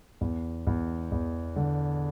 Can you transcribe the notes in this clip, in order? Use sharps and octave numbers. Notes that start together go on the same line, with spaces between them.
E2
E2
E2
D3